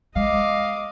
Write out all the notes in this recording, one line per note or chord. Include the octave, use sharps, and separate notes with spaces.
G#3 D#5 F5 D6